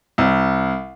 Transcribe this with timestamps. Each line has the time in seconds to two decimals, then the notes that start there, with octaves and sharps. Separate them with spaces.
0.18 C2